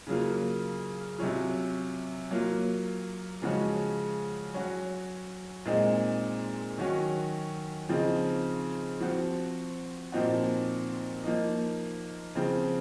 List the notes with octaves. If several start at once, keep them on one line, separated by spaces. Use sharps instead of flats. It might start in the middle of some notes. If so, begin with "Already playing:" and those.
C#3 F#3 A#3 F4
C3 F#3 C#4 F4
F#3 A#3 F4
C#3 F3 G#3 C#4 F#4
F#3 C#4 F#4
A#2 G#3 C4 D#4
D#3 F#3 C#4 F#4
C#3 F3 C4 D#4
F3 C4 F#4
A#2 F3 C4 D#4 F#4
F3 A#3 D#4
C#3 F3 C4